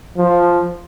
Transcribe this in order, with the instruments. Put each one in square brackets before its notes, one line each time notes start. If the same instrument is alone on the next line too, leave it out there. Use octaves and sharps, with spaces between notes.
[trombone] F3